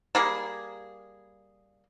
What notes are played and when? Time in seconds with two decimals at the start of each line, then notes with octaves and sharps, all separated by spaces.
0.15 G3 A#3 G#4